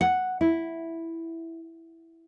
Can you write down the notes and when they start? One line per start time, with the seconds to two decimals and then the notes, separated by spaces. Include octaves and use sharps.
0.01 F#5
0.41 E4